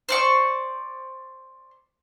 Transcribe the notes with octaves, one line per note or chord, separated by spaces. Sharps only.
C5 D5 C#6